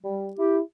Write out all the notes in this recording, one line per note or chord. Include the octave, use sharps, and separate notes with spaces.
G3
E4 G4